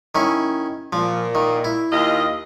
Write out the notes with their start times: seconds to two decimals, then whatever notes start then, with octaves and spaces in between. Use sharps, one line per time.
0.15 D#3 C#4 E4
0.93 A#2 F3
1.35 D#3
1.64 E4
1.91 D#2 F4 D#5